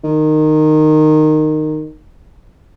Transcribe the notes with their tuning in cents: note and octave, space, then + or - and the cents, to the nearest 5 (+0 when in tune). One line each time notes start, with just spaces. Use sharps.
D#3 -15